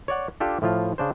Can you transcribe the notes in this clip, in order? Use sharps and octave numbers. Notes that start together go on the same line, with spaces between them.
C#5 D5 F#5
D4 F4 G4 A4
A2 F3 F4
C#3 D4 C5